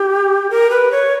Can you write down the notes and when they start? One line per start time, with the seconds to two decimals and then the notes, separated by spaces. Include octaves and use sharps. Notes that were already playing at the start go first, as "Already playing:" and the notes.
Already playing: G4
0.50 A#4
0.70 B4
0.91 C#5